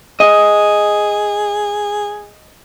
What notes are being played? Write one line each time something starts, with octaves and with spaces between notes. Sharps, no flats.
G#4 D#5